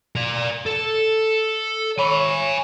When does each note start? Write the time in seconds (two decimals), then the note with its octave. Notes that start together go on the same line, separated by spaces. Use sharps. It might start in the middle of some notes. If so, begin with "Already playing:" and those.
0.15 A#4 D5
0.66 A4
1.99 C#5 G#5 B5